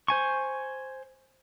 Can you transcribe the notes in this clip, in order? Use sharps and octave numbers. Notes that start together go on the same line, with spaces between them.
C5 G#5 C#6